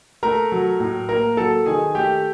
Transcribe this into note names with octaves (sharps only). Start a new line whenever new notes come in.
A3 A#4 A#5
F#3
A2
A#3 A#4 A#5
F#3 A4 A5
D#3 G#4 G#5
A3 G4 G5